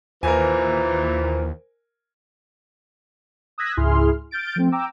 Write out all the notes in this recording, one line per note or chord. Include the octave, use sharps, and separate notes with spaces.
D#2 A#2 E3 A#4 C5 G#5
D#6 E6 F#6 G#6 A#6 B6
C#2 G#2 E4 G#4 C6 F6
F6 G6 A6 D7
F3 A3 C4
G5 A#5 D6 E6